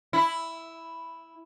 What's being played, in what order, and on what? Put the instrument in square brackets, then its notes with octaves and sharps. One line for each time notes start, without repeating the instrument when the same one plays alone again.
[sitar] E4